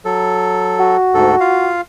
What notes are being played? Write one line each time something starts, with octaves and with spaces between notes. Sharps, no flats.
F#3 A4
F#4
D2 G#2 A4
F4 F5